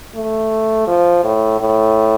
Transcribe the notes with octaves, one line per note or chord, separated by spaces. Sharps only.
A3
F3
A2
A2